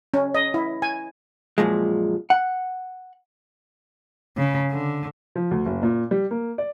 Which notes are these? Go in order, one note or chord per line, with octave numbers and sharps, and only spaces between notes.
C#4
D#5
E4
G#5
F#2 A#2 F3 G#3
F#5
C#3
D3
F3
D2
F#1
A#2
G3
A#3
D5